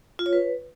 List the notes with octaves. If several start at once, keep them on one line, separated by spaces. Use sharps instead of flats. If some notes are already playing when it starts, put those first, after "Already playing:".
F4
C#5
B4